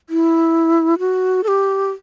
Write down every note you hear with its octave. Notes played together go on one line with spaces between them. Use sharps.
E4
F#4
A4
G4